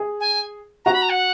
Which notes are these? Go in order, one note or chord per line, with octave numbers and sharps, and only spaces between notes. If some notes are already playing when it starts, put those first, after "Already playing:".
Already playing: G#4
G#5
F#4 A#5
B5
A#5
F#5